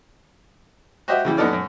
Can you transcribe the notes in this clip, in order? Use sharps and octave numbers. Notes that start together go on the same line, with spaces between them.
F#4 G4 C5 D#5 E5
C#3 E3 G3
F#2 B3 D#4 A4 D5 F6
F#2